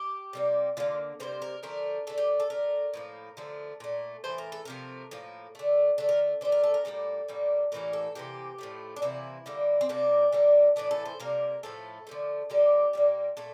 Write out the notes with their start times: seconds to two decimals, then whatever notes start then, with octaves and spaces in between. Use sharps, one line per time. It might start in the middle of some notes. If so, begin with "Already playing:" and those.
Already playing: G4
0.33 C3 G3 A#3
0.77 D3 G3 A#3 F4
1.20 C3 G3 A#3 C5
1.42 A#4
1.63 D3 F3 A3 A#4
2.07 D3 A3 A4
2.18 G4
2.40 A4
2.50 D3 A3 A#4
2.94 A2 F3 A#3
3.37 D3 F3 A3
3.80 A#2 A3
4.24 A2 E3 A3 C5
4.38 A#4
4.52 A4
4.65 C3 F3 A3 A#4
5.11 A2 F3 A#3
5.55 D3 A3
5.98 D3 A3 A4
6.09 A#4
6.41 D3 A3 C5
6.52 A#4
6.63 A4
6.74 A#4
6.85 A2 G3 A#3 A4
7.28 A2 G3 A#3
7.72 A2 E3 G3 A#3 A#4
7.93 A4
8.15 C3 E3 A#3 G4
8.58 A2 F3 A3
8.96 D4
9.02 C3 E3 A#3 E4
9.46 D3 G3 A#3
9.81 C4
9.89 C3 G3 A#3 D4
10.32 D3 G3 A#3
10.76 A2 E3 A3 D4
10.91 A4
11.05 C5
11.20 C3 G3 A#3 A#4
11.63 A2 F3 A3 A4
12.07 D3 F3 A3
12.50 D3 G3 A#3 G4
12.93 A#2 G3 A#3
13.37 A#2 A3 A4